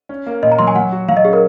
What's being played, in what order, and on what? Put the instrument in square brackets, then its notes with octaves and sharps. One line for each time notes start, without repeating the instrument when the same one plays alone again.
[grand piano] C#4
A#3
[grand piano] A#2 [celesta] D#5
[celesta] A#5
[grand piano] F#3 [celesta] C6
[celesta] G#5
[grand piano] F#3 [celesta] F#5
[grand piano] F#4
[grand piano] F#3 [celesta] F5
[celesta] D#5
[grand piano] C#4 [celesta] G#4
[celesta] A#4